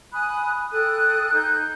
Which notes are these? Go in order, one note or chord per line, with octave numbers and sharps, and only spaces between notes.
G#5 B5 D#6 F#6
A4 G5 D#6 F#6
D#4 F#6 G6